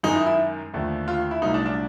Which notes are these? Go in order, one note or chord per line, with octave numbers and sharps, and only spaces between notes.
F#2 D#3 G#3 D#4
E4
E4
D#2 D3 F3 A3
F4
E4
C2 A#2 F#3 A3 D#4
D4
D4